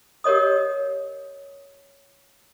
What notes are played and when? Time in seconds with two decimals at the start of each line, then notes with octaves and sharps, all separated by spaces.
0.24 G4 A#4 C#5 D#5 D#6